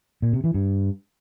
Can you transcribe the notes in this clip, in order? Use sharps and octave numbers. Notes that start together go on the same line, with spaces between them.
A#2
C3
E3
G2